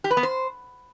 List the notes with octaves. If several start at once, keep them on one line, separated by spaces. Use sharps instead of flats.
G4
B4
B3
C5